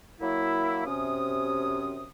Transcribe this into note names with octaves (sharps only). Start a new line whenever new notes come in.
F#3 A#3 E4
F#2 C3 C#4 D#6